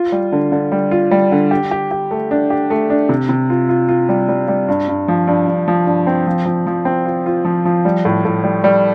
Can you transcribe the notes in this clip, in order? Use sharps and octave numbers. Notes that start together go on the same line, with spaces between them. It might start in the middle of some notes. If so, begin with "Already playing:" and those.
Already playing: F4
G3
D3
D3
G3
F4
G3
D3
G4
G4
G4
A3
D4
G4
A3
D4
C3
C3
F4
F4
F4
G3
G3
G3
G2
G2
F3
G2
G2
F3
G2
C4
F3
F3
F3
C4
F4
F4
F3
F3
G3
A2
A2
G3
G3